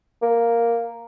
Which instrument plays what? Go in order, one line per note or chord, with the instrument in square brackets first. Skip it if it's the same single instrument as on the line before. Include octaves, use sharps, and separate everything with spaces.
[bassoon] A#3